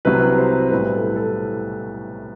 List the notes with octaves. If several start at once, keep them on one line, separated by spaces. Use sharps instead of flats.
C2 C3 F#3 B4
C5
B1 A2 G3 B4
A4
A4